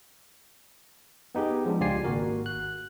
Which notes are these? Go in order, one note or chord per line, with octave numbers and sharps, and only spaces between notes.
B3 D#4 G4 G#4
F3 G#3 D4
C#2 F4 G4 D5 G#5 C7
G#1 A#3 F#4 A#4
F#6